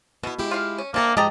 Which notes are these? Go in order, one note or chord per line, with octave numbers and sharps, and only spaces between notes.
B2 B3 E4
G#3 E4 G4
F4 F5
C#4
C3 A#3 D4 A4 A#4
G#2 F3 G#3 G4 D#5 A5 A#5